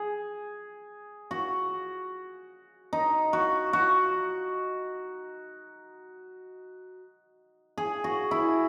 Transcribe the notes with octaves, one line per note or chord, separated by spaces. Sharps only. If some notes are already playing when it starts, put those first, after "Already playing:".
Already playing: G#4
F#4
D#4
F#4
F#4
G#4
F#4
E4